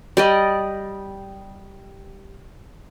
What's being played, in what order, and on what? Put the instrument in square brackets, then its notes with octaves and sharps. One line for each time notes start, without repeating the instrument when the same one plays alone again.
[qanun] G3 D5 D#5